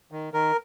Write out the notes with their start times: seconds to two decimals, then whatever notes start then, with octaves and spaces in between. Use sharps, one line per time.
0.12 D#3
0.33 D#3 A#4